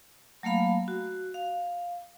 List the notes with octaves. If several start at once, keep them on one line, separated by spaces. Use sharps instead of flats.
F#3 A3 A#3 F5 B5
F#4
F5